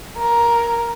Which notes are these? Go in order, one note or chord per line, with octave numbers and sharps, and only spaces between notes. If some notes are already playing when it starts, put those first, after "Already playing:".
A#4